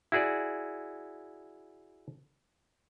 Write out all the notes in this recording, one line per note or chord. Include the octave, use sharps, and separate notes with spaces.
E4 F#4 G#4 D5